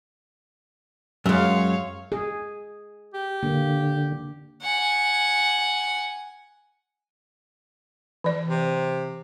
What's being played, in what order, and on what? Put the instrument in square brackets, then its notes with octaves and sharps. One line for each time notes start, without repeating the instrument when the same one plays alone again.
[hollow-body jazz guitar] F#2 G#3 [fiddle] C#5 F5
[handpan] G#4
[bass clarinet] G4
[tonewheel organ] D3 [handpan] A#3
[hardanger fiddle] F#5 G#5
[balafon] E3 D5
[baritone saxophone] C3